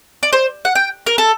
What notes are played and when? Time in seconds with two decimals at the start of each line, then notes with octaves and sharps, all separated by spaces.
0.23 D5
0.33 C5
0.65 F#5
0.75 G5
1.07 A#4
1.18 A4